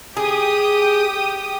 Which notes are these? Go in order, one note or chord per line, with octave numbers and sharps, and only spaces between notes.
G4 G#4 G5 D#6